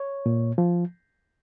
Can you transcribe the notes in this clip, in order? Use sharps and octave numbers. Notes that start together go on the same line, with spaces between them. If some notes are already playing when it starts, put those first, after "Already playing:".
Already playing: C#5
A#2
F3